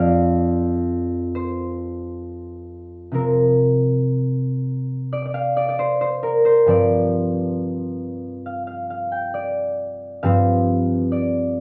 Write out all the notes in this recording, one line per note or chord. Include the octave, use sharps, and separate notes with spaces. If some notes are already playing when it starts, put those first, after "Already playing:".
Already playing: F2 F3 C4 D5 F5
C5
C3 F3 C4 A#4
D5
D5
F5
D5
D5
C5
C5
A#4
C5
G2 F3 C4 D5
F5
F5
F5
G5
D5
G2 F3 C4 F5
D5